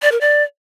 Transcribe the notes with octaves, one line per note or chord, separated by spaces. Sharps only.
D5
A#4
D5